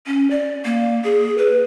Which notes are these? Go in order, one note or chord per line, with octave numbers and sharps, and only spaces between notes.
C#4
D5
A#3
G#4
B4